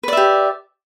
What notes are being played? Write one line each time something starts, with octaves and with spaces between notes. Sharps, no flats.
G4 B4 D5 E5